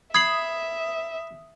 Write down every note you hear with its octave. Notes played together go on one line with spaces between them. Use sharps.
E5 B5 D#6 G#6 C7 F#7